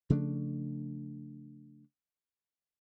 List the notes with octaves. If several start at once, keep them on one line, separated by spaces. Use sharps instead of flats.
C#3 F3 A3 D4